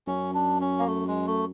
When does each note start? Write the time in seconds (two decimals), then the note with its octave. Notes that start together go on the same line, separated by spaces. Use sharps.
0.07 F#2 C#4
0.34 D4
0.61 C#4
0.79 A#3
0.87 A3
1.08 G#3
1.27 A3